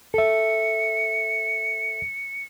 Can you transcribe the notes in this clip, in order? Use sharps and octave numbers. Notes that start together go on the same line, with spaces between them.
A4 E5 C#7